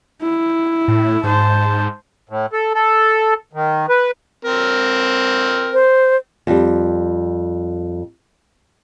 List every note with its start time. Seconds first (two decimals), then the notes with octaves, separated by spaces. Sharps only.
0.22 E4
0.88 A2
1.24 G#2 C5 A5
2.29 A2
2.53 A4
2.74 A4
3.53 D#3
3.89 B4
4.45 C4 A#4
5.73 C5
6.47 F2 G3